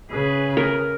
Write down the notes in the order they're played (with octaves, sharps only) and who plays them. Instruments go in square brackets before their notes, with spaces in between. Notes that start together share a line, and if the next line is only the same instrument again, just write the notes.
[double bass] C#3 [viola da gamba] G#4 B4
[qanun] A#4